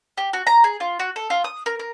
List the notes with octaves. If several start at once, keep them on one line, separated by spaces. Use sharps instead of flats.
G4
F#4
A#5
G#4
F4
F#4
A4
F4
D#6
A#4
A#4